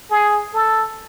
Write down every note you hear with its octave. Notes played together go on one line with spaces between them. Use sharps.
G#4
A4